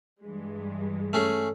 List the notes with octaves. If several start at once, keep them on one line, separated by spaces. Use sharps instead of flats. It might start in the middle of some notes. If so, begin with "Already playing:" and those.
G2 E3 G#3
A3 C#4 G#4